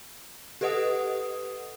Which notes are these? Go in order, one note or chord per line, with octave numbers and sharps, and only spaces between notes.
G4 A4 B4 D#5 F#5 D#6